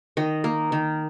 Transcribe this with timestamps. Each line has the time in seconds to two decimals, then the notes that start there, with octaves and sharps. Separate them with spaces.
0.17 D#3 D#5
0.44 A#3
0.72 D#3